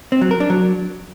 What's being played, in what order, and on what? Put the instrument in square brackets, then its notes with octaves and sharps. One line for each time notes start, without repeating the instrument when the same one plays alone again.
[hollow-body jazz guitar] C4
F#3
A#4
D4
F#3